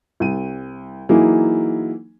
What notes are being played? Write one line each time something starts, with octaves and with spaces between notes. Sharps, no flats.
C2 D#7
E3 F#3 A#3 D#4 E4 G#4